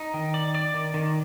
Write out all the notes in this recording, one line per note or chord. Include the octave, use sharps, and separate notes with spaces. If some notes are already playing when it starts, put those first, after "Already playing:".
Already playing: D#4
D#3
D5
D5
D#3
D#3